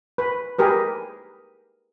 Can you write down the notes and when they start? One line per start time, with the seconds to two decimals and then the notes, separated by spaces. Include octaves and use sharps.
0.18 B4
0.59 G4 G#4 A#4 B4